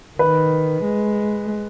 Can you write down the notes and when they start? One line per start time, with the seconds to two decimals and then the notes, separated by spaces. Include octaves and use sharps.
0.19 D#3 B4
0.84 G#3